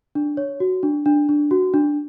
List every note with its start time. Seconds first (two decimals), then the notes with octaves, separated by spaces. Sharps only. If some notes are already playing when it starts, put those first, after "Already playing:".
0.15 D4
0.37 C#5
0.60 F#4
0.83 D4
1.06 D4
1.29 D4
1.51 F#4
1.74 D4